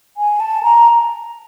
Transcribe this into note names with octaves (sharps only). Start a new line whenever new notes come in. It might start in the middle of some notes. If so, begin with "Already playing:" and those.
G#5
A5
A#5